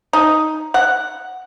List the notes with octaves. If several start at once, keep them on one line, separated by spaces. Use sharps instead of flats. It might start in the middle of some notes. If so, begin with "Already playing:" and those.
D#4
F#5